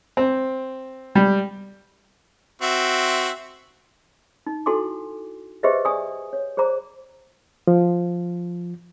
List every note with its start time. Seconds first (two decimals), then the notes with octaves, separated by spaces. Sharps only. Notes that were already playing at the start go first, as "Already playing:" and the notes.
0.17 C4
1.15 G3
2.61 C4 F#4 E5
4.47 D#4
4.66 E4 F#4 A4 G#5 C6 D6
5.63 G4 G#4 B4 C5 D#5 E5
5.85 D5 G#5 C#6 D#6
6.33 C#5
6.57 G#4 C5 D5 A#5 D6
7.67 F3